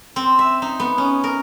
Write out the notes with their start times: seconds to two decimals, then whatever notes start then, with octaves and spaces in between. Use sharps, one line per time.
0.16 C4
0.39 E5
0.62 D#4
0.80 B3
0.98 C#4
1.24 A#4